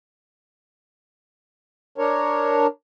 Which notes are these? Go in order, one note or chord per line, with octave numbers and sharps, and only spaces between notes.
D4 A#4 C#5